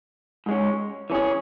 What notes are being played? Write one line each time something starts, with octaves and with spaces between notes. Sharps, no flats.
G#2 G#3 C#4
E3 C#4 G#4